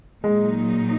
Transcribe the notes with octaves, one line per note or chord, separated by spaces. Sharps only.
A#2 F#3 G#3 A#3 D#4